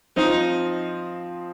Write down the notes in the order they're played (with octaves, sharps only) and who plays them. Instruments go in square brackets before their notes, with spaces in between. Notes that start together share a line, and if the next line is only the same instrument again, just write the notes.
[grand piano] F3 C4 F4 C5 D#5 [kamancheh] D#4